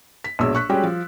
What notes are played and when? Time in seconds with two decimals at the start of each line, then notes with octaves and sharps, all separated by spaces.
0.24 B6
0.39 A#1 B2 G#3 C#5 E6
0.55 C#6 F#6 B6
0.69 G3 G#3 C#4 F#4 G4
0.84 F3